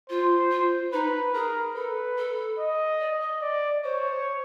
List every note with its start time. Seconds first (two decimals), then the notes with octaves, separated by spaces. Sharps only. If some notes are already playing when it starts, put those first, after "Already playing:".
0.10 F4 C5
0.51 F4
0.93 D#4 B4
1.34 G#4 A#4
1.75 A4 B4
2.18 A4
2.59 D#5
3.00 D5
3.21 D#5
3.42 D5
3.83 C5 C#5